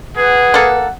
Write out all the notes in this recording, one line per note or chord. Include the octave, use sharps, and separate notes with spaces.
G#4 B4 F#5
A#3 A4